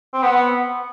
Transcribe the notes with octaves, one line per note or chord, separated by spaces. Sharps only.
C4
B3 F#5